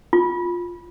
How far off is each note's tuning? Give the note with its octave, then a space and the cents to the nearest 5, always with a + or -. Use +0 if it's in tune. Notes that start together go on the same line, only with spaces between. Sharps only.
F4 +5